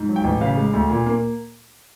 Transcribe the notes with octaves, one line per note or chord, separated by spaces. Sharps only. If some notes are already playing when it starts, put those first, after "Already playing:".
Already playing: G#2
F#3
G5
A1
C#3 F5
G#3
D2
A#2
A#3